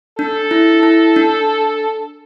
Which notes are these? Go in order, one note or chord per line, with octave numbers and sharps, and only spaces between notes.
D4 A4
E4
E4
D4